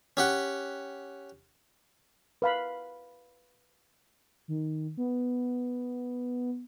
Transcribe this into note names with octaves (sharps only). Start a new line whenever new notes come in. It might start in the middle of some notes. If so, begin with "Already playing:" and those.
C#4 G4 F#5
B4 F5 B5
D#3
B3